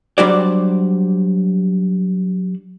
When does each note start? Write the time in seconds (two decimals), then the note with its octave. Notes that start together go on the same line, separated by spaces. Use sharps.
0.18 F#3 G3 D4 F#4 C5 D5